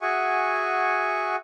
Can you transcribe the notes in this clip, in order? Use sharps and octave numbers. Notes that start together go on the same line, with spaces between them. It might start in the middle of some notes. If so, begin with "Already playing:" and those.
F#4 G#4 E5 F#5 G#5 C#6